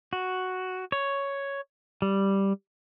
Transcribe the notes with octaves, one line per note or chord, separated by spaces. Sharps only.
F#4
C#5
G3